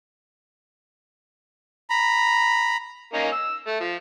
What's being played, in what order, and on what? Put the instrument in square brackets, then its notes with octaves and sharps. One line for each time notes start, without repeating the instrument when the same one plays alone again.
[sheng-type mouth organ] A#5 B5
[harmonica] A#3 C#4 D#4
E6
A3
F3